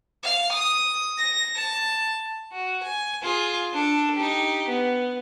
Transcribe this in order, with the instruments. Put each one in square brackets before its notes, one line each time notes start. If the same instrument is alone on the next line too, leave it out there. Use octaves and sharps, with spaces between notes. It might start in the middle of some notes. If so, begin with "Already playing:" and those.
[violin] F5
D#6
A#6
A5
[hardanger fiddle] F#4
G#5
F4 G#4
D4 A4
D#4 G4
B3